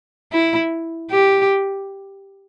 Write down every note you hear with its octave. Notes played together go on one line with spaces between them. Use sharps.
E4
G4